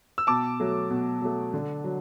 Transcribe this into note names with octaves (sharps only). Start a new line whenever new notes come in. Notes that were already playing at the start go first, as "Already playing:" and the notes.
E6
B2 A5 D6
F#3 A3
B2
F#3 A3
D3
F#3